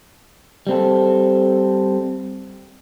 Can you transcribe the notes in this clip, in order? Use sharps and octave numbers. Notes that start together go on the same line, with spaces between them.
G3 C4 A4